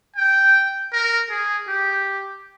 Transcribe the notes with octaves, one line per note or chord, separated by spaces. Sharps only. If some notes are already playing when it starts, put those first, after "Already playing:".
G5
A#4
G#4
G4